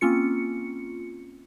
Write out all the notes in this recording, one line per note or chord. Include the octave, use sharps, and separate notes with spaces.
A#3 C4 C#4 F4 C#7